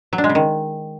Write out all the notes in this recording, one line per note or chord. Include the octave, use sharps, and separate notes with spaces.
F#3
D4
G#3
C#3
D#3